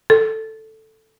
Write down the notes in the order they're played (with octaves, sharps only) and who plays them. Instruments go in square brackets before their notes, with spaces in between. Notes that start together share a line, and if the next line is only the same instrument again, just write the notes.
[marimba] A4